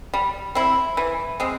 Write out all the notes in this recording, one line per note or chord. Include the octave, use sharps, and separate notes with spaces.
G3
C4 E4
E3
G#3 C4